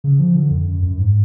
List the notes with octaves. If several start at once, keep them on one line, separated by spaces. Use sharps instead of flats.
C#3
F3
D3
F2
F#2
F#2
G#2